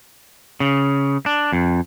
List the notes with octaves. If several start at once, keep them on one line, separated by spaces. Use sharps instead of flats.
C#3
D4
F2